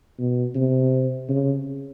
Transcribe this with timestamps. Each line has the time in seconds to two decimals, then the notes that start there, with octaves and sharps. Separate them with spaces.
0.19 B2
0.55 C3
1.29 C#3